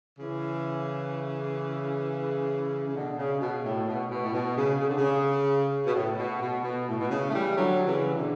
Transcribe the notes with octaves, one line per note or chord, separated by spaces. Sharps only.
C#3 E3
C#3
B2 D3
C#3
B2
A2
B2
B2
A2
B2
C#3
C#3
D3
C#3
B2
A2
B2
B2
B2
A2
B2
C#3
A3
E3 G3
D3 F#3
C#3 E3
B2 D3